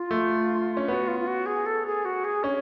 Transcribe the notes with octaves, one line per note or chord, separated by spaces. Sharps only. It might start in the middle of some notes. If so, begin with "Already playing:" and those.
Already playing: F4
A3
C#4
B3 F#4
F4
F4
F#4
G#4
A4
G#4
F#4
G#4
C#4 C#5